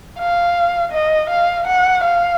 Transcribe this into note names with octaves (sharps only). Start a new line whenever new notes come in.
F5
D#5
F5
F#5
F5